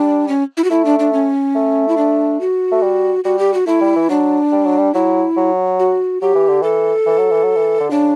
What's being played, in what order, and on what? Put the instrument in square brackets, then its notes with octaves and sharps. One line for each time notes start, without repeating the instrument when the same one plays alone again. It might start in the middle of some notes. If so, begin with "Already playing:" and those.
Already playing: [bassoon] G3 [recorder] D4
[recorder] C#4
E4
F#4
[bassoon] A3 [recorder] E4
[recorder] D4
D4
C#4
[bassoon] A3
[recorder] E4
D4
F#4
[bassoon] A3
G3
[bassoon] G3 [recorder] F#4
[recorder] G4
F#4
[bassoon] A3 [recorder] E4
[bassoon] G3
E3
[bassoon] F#3 [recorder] D4
[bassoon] G3
F#3
G3
[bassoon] F#3 [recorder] E4
[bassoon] F#3
[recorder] F#4
[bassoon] F#3 [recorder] G4
[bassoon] E3
D3
[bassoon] E3 [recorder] A4
[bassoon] E3
F#3
E3
F#3
E3
D3
[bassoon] C#3 [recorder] D4